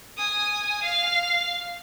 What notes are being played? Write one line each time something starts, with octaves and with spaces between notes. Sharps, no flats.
G#5 D#6
F5